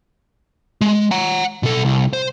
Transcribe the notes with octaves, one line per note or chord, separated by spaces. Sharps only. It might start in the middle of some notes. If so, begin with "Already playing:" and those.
G#3
F#5 A#5
B2 A4
C2
C5